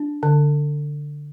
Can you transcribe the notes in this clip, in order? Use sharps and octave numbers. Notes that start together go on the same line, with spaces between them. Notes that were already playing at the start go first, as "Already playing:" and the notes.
Already playing: D4
D3